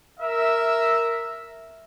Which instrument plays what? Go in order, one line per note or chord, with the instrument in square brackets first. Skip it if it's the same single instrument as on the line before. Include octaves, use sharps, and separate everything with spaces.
[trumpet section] A#4 E5